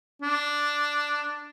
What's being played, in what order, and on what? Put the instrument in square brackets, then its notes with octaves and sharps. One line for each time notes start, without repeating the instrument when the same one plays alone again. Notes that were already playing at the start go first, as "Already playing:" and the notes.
[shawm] D4